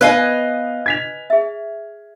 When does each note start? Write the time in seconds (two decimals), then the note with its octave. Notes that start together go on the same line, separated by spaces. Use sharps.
0.01 B3 B4 D#5 F5 G#5 C7
0.26 C5
0.86 G#6 B6 F7
1.30 G#4 E5